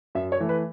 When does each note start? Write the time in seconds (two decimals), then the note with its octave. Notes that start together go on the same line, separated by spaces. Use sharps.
0.15 F#2 E5
0.32 C#5
0.40 E3 A3
0.49 B4